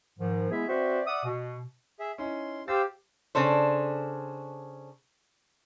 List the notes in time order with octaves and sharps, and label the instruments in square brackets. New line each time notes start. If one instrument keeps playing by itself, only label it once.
[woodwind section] G#2 D#3 F3
G#3 B3 E4 G#4 E5
C4 F#4 B4 C5 D5 E5
D5 E5 F#5 D#6
B2
[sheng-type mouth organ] G#4 E5
[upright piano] C#4 D#4 E4 [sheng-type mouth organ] C6
[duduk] G4 [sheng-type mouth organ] C5 F5 E6 [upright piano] A6
[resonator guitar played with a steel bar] C#3 D4 A4 C5